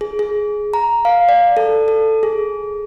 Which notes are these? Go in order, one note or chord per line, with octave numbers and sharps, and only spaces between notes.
G#4
G#4
A#5
F5
D5
A4
A4
G#4